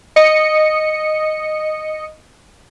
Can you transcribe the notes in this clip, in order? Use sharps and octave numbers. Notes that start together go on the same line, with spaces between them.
D#5 C#7